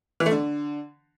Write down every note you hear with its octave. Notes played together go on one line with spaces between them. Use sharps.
E3
A3
D3